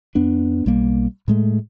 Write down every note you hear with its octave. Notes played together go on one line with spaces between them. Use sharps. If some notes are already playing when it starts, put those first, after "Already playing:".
F2 B3 D4
B1 G3 A#3
A2 G#3 A3